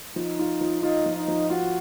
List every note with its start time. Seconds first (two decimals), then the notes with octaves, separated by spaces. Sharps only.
0.16 F3 D#4
0.39 F4
0.61 F3
0.83 D#4 F4
1.06 F3
1.17 D#4
1.28 F3
1.50 F4 F#4